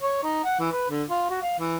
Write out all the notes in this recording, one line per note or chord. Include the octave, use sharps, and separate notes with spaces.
C#5
D#4
F#5
E3
B4
D3
F4
F#4
F5
E3